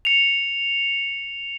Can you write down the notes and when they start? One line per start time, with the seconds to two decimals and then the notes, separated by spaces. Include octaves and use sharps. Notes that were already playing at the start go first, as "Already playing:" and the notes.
0.05 C#7 F7